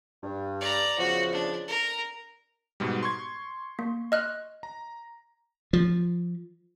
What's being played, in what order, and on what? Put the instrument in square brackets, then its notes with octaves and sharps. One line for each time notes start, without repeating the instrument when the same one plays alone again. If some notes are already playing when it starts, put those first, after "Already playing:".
[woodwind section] G2
[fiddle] D5 A#5
[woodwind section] E2 C#3 F3 [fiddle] F#4
[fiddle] D4
A#4
[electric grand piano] G#2 B2 G3
C6 C#6 G#6
[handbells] A#3
D#5 F6 F#6
[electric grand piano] A#5
[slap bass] F3